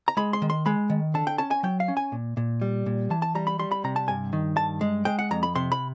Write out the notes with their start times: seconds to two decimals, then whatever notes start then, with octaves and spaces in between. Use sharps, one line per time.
0.08 A#5
0.17 G#3 B5
0.33 C6
0.42 D#3
0.50 C6
0.66 G#3 B5
0.90 D#3
1.14 D3 A5
1.27 G5
1.38 C#4 A5
1.51 G#5
1.63 F#3 G5
1.80 F5
1.88 C#4
1.97 G#5
2.12 A#2
2.37 A#2
2.61 G3
2.86 A#2
3.10 E3 A5
3.22 A5
3.35 G3 A#5
3.47 B5
3.59 G3 C6
3.72 B5
3.84 C3 A#5
3.96 A5
4.08 G2 G#5
4.33 D#3
4.57 G2 A5
4.81 G#3
5.05 G#3 G5
5.19 F#5
5.31 F2 A#5
5.43 B5
5.55 C3 C6
5.72 B5